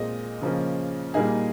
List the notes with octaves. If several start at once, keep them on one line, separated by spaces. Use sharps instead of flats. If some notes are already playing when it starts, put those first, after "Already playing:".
Already playing: A#2 G#3 C4 D#5
C#3 F3 A#3 C#4
A#2 G3 A#3 D#4 G#4